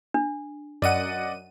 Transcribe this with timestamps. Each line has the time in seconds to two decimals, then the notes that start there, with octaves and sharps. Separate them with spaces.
0.14 D4
0.82 F#2 D5 D#5 F#5 D#7